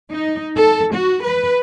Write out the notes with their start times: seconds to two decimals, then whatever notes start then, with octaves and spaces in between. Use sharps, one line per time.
0.10 D#4
0.56 A4
0.92 F#4
1.24 B4